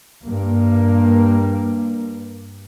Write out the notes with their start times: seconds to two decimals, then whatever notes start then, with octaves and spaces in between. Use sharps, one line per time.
0.24 G2 A#3